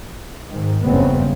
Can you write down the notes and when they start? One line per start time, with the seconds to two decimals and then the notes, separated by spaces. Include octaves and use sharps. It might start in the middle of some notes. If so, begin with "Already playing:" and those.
0.47 G#2 D#3
0.85 F#1 E2 G2 C#3 B3 C4